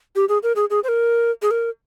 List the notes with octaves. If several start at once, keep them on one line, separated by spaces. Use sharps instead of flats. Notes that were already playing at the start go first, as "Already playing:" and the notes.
G4
G#4
A#4
G#4
G#4
C5
A#4
G#4
A#4